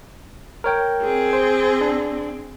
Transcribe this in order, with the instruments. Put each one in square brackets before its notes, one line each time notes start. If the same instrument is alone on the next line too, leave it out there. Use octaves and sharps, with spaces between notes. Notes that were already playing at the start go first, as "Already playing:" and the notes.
[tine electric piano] A#4 C#5 G5
[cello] C4 G#4
[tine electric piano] C5
D4